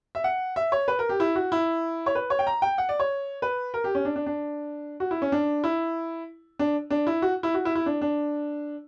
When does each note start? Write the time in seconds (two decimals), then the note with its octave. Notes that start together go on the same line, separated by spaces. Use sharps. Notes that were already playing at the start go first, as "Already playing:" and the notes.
0.15 E5
0.24 F#5
0.56 E5
0.72 C#5
0.88 B4
0.99 A#4
1.09 G4
1.20 E4
1.36 F#4
1.52 E4
2.06 C#5
2.15 B4
2.30 C#5
2.39 G5
2.47 A#5
2.62 G5
2.78 F#5
2.89 D5
3.00 C#5
3.42 B4
3.74 A#4
3.84 G4
3.95 C#4
4.05 D4
4.16 D4
4.26 D4
5.00 F#4
5.11 E4
5.22 C#4
5.32 D4
5.64 E4
6.59 D4
6.90 D4
7.07 E4
7.22 F#4
7.43 E4
7.54 F#4
7.65 E4
7.75 E4
7.86 D4
8.01 D4